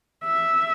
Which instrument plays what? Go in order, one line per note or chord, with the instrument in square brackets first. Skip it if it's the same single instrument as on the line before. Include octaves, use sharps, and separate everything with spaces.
[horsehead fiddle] E5